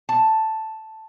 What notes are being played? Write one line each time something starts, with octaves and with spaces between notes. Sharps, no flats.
A5